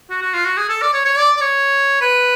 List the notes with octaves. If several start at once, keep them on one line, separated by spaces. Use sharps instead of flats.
F#4
F#4
F4
F#4
G#4
A4
D5
C#5
C#5
D5
D5
C#5
B4